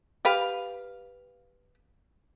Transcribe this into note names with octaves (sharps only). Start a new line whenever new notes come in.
G4 B4 F5